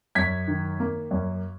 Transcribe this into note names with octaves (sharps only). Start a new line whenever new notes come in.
F#2 G#6 B6
D#3
A#3
F#2